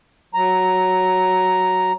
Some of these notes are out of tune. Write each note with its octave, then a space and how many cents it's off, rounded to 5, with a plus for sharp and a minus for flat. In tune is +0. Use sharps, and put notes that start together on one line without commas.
F#3 +0 A#5 +0